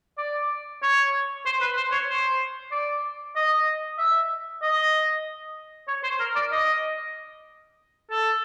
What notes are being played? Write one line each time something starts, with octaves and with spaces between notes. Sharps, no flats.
D5
C#5
C5
B4
C5
C#5
C5
D5
D#5
E5
D#5
C#5
C5
A#4
D5
D#5
A4